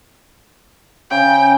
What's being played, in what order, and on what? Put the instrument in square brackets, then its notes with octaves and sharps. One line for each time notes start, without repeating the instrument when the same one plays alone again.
[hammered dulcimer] C#3 [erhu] G5